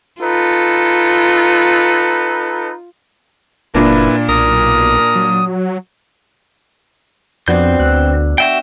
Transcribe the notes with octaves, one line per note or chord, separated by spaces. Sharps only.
D#4 F4 A4 B4
F#1 A#2 A#3 D4 E4 B4
B1 A#4 D#6
F#3
F2 B3 C4 D4 F#4 G6
D2 E6 F#6
F#4 E5 G5